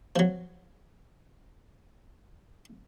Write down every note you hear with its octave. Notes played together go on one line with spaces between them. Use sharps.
F3 F#3